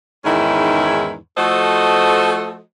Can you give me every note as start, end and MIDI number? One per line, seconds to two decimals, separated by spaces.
0.25 1.16 40
0.25 1.16 44
0.25 1.16 51
0.25 1.16 61
0.25 1.16 64
1.37 2.60 53
1.37 2.60 57
1.37 2.60 66
1.37 2.60 69
1.37 2.60 72
1.37 2.60 75